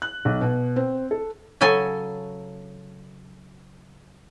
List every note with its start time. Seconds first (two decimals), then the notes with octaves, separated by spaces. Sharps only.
0.02 F#6
0.25 B1
0.41 B2
0.76 C4
1.11 A4
1.61 C#3 F#3 A4 G#5